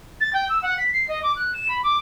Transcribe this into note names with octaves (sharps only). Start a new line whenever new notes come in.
A6
G5
E6
F#5
B6
C7
D#5
D6
F#6
E7
B5
D6